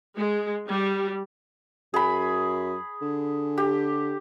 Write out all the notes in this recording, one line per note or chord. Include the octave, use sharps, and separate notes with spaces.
G#3
G3
F#2 G#4 B5
D3
G4